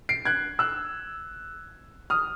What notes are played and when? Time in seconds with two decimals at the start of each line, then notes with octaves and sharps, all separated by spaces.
0.09 C7 D7
0.25 F#6 G#6
0.59 E6 F#6
2.10 D#6 F6